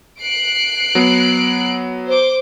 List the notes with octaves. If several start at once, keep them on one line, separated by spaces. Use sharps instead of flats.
F#6 C7 D7
F#3 B3
C5 D6